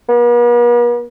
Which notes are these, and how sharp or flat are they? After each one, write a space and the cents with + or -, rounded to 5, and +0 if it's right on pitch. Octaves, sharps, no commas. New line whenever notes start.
B3 -45